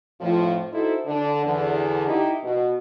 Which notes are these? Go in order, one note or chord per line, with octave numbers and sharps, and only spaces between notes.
F2 A2 F3
D#4 E4 F#4 A4 C5
D3 D4
E2 D3
D#4 E4 G4
B2